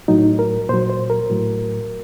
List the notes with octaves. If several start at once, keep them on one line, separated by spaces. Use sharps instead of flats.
A2 F#3 D#4
A#4
A#2 F#3 C5
C5
A#4
A2 F#3